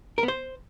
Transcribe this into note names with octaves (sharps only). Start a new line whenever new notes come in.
A#4
B3
C5